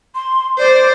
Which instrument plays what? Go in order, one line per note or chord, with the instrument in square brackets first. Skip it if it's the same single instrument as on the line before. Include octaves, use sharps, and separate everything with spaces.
[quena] C6
[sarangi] C5 [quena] D5